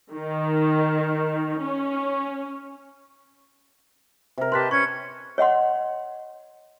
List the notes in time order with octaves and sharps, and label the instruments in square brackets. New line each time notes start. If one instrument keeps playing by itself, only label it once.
[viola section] D#3
C#4
[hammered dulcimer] C3 A#4
[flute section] G4 D#5 A5 [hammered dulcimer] B4 [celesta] C6 F#6 B6
[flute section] C#4 G#6 [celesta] C#6
[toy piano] C#5 D#5 F#5 C6